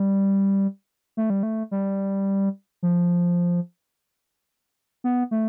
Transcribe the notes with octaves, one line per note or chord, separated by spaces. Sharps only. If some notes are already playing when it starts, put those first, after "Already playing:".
Already playing: G3
A3
G3
A3
G3
F3
B3
A3